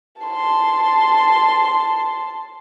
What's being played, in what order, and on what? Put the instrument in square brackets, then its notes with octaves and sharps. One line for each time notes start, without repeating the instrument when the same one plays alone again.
[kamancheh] A5 C6